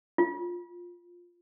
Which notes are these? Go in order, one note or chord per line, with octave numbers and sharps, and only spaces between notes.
F4